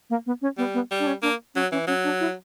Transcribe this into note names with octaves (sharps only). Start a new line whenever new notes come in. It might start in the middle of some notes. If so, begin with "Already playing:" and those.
A#3
B3
C#4
G3 B3
B3
G3
D4
C#4
A#3 D4
F#3 C#4
E3 C#4
F#3 C#4
D4
E4